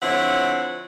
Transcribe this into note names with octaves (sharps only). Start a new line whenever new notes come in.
D3 F3 C4 E4 C#5 F#5